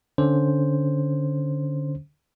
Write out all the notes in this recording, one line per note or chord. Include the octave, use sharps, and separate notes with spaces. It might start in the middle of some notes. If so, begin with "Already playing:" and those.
D3 C#4 C5